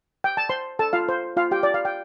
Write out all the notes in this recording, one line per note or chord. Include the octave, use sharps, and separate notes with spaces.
G5
A5
C5 C6
A4 A5
F4 F5
C5
F4 F5
G4 G5
D5
F5
G5